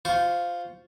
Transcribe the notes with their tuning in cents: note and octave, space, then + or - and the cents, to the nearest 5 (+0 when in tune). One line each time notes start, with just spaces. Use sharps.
F4 +0 C5 -15 C#6 +5